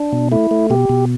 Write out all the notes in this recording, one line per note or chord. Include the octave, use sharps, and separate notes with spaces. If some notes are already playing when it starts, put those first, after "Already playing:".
Already playing: D4
B2
A3 E4
A3
B2 G4
B2